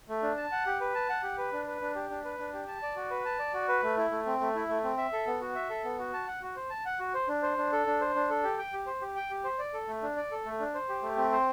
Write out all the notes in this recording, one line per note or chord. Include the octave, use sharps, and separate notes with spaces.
A3
D4
A5
F#5
G4
B4
A5
F#5
G4
B4
D4
B4
D4
G4
D4
B4
D4
G4
A5
D5
F#4
B4
A5
D5
F#4
B4
A3
E4
A3
C4
A3
E4
A3
C4
E5
A4
B3
F#4
E5
A4
B3
F#4
A5
F#5
F#4
C5
A5
F#5
F#4
C5
D4
C5
D4
A4
D4
C5
D4
A4
G4
G5
G4
C5
G4
G5
G4
C5
D5
A4
A3
D4
D5
A4
A3
D4
C5
G4
A3
C4
C5